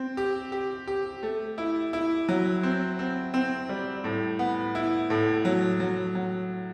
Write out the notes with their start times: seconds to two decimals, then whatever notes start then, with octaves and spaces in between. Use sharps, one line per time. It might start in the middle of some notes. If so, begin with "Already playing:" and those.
Already playing: C4
0.17 G4
0.52 G4
0.88 G4
1.23 A3
1.58 E4
1.93 E4
2.29 F#3
2.63 C4
2.99 C4
3.34 C4
3.69 G3
4.04 A2
4.39 B3
4.75 E4
5.10 A2
5.45 F#3
5.80 F#3
6.15 F#3